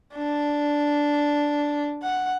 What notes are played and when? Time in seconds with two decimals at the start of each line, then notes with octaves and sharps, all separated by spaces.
0.14 D4
2.03 F#5